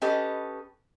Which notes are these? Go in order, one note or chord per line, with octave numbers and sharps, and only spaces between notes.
C#4 G4 A4 B4 D#5